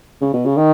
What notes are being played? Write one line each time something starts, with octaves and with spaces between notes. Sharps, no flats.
C#3
B2
C#3
D#3